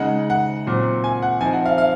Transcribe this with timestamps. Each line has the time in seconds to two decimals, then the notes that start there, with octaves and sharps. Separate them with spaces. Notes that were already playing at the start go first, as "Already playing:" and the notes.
Already playing: C#3 G#3 D#4 F#5
0.30 F#5
0.66 A#2 F#3 C4
1.04 G#5
1.22 F#5
1.41 F3 C4 D#4 G#5
1.53 F#5
1.66 F5
1.78 F5